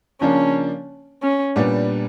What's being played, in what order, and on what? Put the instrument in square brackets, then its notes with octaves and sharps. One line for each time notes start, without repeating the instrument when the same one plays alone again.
[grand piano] C#3 F3 A#3 D4 [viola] C#4
[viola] C#4
[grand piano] A#2 G3 B3 D4